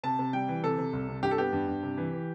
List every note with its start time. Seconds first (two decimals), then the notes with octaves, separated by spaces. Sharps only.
0.03 C3 A5
0.19 C3
0.33 G3 G5
0.48 E3
0.63 C3 A4
0.78 C3
0.93 C2
1.08 C3
1.23 G2 G4
1.31 A4
1.38 B3 G4
1.53 G2
1.68 G2
1.83 C3
1.97 E3
2.13 E3